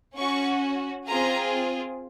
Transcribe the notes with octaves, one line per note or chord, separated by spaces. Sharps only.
C#4 F#4 C#6
C4 F4 G#4 A#5